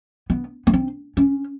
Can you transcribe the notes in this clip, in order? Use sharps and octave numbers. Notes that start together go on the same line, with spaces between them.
B3
B3
C4
C#4